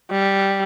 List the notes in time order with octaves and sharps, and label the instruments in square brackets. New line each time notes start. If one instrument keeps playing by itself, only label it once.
[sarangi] G3